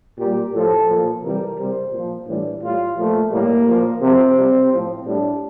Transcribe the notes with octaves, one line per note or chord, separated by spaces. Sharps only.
A#2 G3 G4
A2 F3 A4
A#2 F3
C3 E3 G3 A#4
C3 G3 C5
A#2 F3
A2 E3 G3 D4
A2 G3 F4
A#2 F3 A3
A2 G3 A#3
A#2 F3
C3 F3 C4
C3 G3
A2 F3
A2 G3 D4